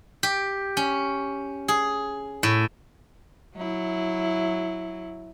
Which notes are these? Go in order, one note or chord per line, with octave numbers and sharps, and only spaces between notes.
G4
C#4
G#4
A2
F#3 E4